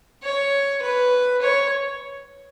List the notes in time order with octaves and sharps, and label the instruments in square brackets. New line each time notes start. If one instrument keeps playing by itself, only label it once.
[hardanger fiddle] C#5
B4
C#5